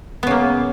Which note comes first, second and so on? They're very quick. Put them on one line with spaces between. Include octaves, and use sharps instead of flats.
B3 C#3 A#3